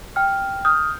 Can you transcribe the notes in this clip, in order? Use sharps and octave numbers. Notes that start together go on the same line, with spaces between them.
G5 F6
D#6 F6 G6